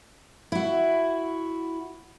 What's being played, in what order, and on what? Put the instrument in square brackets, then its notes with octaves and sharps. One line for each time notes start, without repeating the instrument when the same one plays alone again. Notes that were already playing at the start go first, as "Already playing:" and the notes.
[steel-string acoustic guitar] E4 F#4